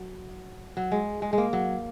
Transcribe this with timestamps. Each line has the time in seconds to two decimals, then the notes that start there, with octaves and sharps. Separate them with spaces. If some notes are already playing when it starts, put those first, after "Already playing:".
Already playing: F#3
0.77 F#3
0.92 G#3
1.22 G#3
1.33 G#3
1.38 A#3
1.53 F#3